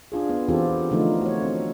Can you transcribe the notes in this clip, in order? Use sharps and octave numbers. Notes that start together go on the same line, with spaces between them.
D4 F4 G#4
B3
E3 B3 C4 F4 G4 A4
D3 F3 A3 D4 D#4 F4
F#4 C#5
C4